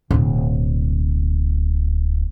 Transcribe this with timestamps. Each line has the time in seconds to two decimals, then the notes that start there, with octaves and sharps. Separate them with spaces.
0.11 D1 B2